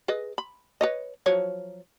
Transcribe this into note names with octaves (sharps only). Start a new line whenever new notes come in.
G#4 B4 D#5
B5
B4 C#5 D#5
F3 F#3 C#5